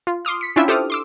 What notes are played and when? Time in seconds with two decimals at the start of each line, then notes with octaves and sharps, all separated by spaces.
0.07 F4
0.25 C6 D6 D#6 F6
0.41 B6 C#7
0.56 C#4 D4 E4 F4 E5 G5
0.68 G4 A4 C5 D6 D#6 F6
0.90 C6 D6 E6